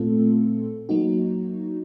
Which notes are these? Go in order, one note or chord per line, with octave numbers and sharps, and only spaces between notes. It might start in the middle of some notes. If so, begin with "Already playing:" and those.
Already playing: A#2 A3 C4 F4 A4
F#3 A#3 D#4 F#4